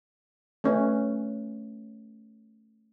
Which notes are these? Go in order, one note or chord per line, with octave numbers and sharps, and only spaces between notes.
A3 C#4 B4